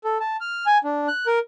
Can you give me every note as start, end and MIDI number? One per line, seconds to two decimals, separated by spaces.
0.04 0.18 69
0.20 0.36 81
0.41 0.66 89
0.66 0.78 80
0.84 1.08 62
1.08 1.26 90
1.27 1.39 70